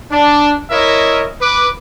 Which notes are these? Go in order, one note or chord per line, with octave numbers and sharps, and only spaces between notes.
D4
E4 A#4 C#5 D#5 E5
B4 D6